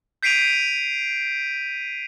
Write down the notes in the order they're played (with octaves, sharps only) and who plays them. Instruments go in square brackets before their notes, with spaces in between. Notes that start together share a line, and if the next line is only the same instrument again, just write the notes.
[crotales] G6 B6 C7 D7 D#7 F7